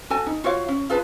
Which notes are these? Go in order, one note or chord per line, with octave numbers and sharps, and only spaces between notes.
F#4 A4 G#5 A5
D#4
F4 F#4 C#5 F5
C#4
F4 G#4 B4 A5